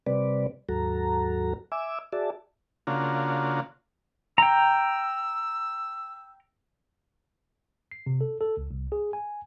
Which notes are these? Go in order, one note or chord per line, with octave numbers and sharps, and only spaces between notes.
C3 G3 C4 B4 D5
D#2 G#2 F#3 F#4 A4 A#5
E5 G#5 D6 E6
F#4 G#4 D5 E5 A5
C#3 A#3 D4 F4 F#4
G5 A#5 E6
C7
C3
A4
A4
C#2
C2
G#4
G#5